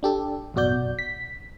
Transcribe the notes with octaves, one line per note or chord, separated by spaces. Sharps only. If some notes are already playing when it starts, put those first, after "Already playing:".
D4 G4 A4
A1 F#2 B2 F#4 D5 G6
B6